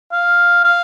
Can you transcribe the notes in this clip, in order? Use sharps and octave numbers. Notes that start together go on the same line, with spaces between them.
F5
F5